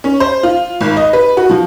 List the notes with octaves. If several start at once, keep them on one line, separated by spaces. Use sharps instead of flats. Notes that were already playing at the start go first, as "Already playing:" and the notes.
C#4
C5
F4
G#1
D#5
B4
F#4
F3